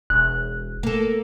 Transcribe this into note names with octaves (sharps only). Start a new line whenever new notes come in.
E1 F#6
A#3 A4